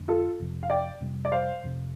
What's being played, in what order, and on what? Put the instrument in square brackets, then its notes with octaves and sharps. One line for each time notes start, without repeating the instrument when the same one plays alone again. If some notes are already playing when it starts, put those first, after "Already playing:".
Already playing: [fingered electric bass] F2 D3 A3
[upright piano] F4 A4
[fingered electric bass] F1 F2 C3 F3
[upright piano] F5
D5 G5
[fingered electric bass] F2 C3 G3
[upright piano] D5
C5 F5
[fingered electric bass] F1 F2 C3